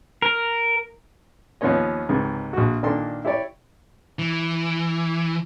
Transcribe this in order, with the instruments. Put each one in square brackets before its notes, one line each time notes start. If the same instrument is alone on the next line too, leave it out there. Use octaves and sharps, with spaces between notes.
[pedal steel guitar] A#4
[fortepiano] D#2 F3 B3 C#4 C#5 D#5
C#2 G#2 C3
A#1 F#4
A#2 D#3 A#3 D4 A4 C6
E4 G4 C#5 D5
[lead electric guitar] E3